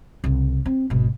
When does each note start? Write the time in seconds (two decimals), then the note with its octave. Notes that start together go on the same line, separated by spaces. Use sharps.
0.24 C2 C#3
0.66 C4
0.90 G#1 B2